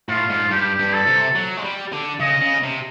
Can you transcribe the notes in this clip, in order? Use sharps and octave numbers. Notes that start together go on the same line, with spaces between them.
A2 F4
G#2
G2 G4
G2
A4
C3
F#3
G#3
G3
D3
C#3 D#5
C#3
C3